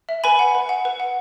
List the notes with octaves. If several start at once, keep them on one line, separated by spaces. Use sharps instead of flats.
E5
B4 G#5 B5
F#5
B4
F#5
B4
F#5